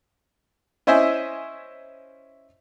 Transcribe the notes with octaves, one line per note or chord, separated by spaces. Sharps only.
C#4 E4 C5 D#5 E5 G#5